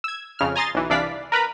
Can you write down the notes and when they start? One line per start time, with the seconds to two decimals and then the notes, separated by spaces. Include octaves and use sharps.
0.04 E6 G#6
0.39 F2 C#3 F6
0.56 G#5 A#5 C6 D#6 A6
0.75 B1 E3
0.90 C2 E3 D4 D5 F5 B6
1.32 A#4 B4 A#5 B5